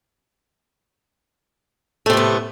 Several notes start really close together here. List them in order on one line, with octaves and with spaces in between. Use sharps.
A3 C3 A2 B3